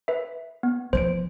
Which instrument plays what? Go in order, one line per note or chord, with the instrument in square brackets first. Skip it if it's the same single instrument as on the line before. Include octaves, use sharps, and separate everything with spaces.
[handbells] B4 E5
B3
[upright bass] E3 F3 [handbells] C5 D7